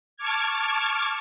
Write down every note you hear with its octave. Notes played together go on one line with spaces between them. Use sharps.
A5 C#6 D6 F6 G#6